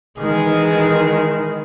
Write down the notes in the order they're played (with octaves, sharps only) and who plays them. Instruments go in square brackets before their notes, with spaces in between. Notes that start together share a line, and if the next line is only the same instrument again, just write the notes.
[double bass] D#3 [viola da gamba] E3 G#3 G#4